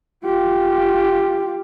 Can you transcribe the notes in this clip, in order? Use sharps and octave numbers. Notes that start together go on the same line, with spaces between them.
F4 G4